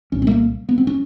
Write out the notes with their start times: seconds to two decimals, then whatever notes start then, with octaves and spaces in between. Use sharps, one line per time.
0.12 C2 A#2 C#4
0.22 C4
0.27 A3
0.31 A#3
0.69 B3
0.78 C4
0.87 C#4